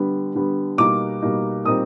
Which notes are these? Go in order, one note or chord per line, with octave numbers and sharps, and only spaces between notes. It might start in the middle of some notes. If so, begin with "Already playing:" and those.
Already playing: D3 G3 B3
D3 G3 B3
B2 G3 A#3 D#4 D6
B2 G3 A#3 D#4
A#2 G3 C4 D#4 D#6